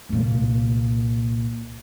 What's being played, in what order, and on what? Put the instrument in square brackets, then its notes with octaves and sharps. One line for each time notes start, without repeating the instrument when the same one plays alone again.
[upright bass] C2 A#2